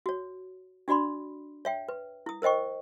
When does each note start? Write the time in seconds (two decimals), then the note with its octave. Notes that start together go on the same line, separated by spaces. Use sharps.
0.06 F#4 C#5
0.88 D4 F#4 D5 B5 C6
1.65 C#5 E5 G5
1.89 B4
2.26 E4 D#6
2.42 A#4 C5 D#5 G5 C#6